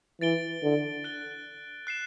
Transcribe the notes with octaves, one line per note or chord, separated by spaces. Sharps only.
E3 A6 D7 G7
D3
F#6 A6 D7 G7
F#6 C7 E7